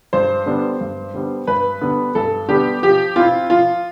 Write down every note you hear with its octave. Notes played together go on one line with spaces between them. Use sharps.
G2 C5
D3 G3 B3 D4
G2
D3 G3 B3 D4
G2 B4
D3 G3 B3 D4
G2 A4
D3 G3 B3 D4 G4
F3 G4
C4 E4 F4
F3 F4